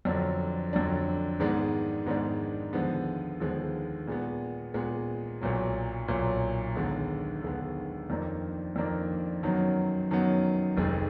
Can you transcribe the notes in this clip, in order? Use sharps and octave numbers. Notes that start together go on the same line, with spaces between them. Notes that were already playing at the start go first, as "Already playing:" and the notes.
F2 D3 F#3 D4
F2 D3 F#3 D4
G#2 D#3 G#3 B3 D4
G#2 D#3 G#3 B3 D4
D#2 D3 F3 G#3 B3
D#2 D3 F3 G#3 B3
A#2 G#3 B3
A#2 G#3 B3
B1 A#2 F#3
B1 A#2 F#3
D#2 D3 G#3 B3
D#2 D3 G#3 B3
F2 D#3 A#3 D4
F2 D#3 A#3 D4
F#2 D#3 F#3 B3
F#2 D#3 F#3 B3
F1 F2 D#3 G#3